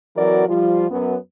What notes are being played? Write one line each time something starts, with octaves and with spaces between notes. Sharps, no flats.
E3 F#3 C4 F#4 A#4 D5
F3 G3 F4
F#2 B3